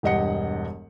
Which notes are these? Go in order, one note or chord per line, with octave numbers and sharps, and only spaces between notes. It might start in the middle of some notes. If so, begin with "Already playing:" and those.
E1 G2 G4 D#5 F#5 C#7